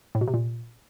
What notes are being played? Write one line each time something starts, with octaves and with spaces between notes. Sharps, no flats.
A2
B2
C3
A#2